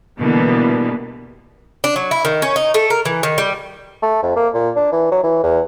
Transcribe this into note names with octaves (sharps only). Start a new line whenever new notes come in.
B2 D3 E3 G3 A#3 B3
D4
F#3
E4
D#3
C#4
D#4
A3
A#4
E3
D#3
G3
A3
F2
A#3
A#2
D4
E3
F#3
E3
E2